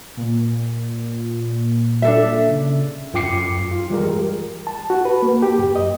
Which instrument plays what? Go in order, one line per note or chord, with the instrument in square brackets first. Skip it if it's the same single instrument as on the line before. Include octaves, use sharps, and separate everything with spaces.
[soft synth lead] A#2
[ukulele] D4 A4 E5
[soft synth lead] C#3
[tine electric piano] F#2 F4 G5 D6 C7 C#7
F4
E3 G3 G#3 G4 G#4 A#4
[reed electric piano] A5
F#4
B4
A#3
G4
F#2
D#5